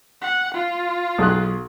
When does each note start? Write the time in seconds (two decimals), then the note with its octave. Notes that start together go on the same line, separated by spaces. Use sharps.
0.21 F#5
0.54 F4
1.18 B1 G#4 F#6